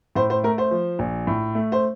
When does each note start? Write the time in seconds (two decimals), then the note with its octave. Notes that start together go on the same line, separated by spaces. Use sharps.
0.15 A2 C5
0.30 C5
0.43 A3 A#4
0.58 C5
0.71 F3
0.99 A#1
1.27 A2
1.55 A3
1.72 C5